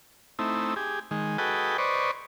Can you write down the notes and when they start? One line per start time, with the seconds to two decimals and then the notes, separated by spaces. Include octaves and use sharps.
0.39 A3 C4 D#4 E4
0.76 G4 G#4
1.11 D#3 G#3
1.38 F#4 G#4 A4 B4 D#5 G5
1.78 B4 C5 D5 D#5 C#6